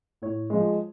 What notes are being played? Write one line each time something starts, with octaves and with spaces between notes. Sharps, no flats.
A2 C#5
F3 G#3